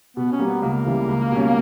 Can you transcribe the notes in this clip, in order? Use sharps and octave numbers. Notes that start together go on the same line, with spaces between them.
B2 B3
C#4
G3 A#3
B3
C#2 A#3
C#3 E3 G3
C#2
B2 G3 C#4